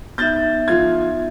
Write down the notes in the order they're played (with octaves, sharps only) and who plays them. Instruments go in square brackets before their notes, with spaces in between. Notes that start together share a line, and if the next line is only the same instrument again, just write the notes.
[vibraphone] B3 D#4 E5 [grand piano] G6 A6
[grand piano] F3 F4 G#6